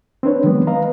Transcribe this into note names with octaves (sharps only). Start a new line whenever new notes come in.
C4 D4 B4 C#5
D#3 F#3 G#3 B3 B4
B4 D#5 F5 A#5